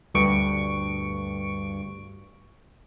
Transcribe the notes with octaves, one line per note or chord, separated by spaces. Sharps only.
D2 G2 C#6 D7